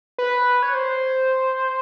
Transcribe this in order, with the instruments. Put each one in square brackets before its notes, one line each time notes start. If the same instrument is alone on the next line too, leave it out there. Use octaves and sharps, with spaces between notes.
[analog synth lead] B4
C#5
C5